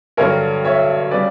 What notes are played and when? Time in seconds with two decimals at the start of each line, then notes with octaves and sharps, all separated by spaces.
0.17 G2 D3 F#3 A#4 C#5
0.65 C#5 E5
1.11 C#3 G3 B4 D5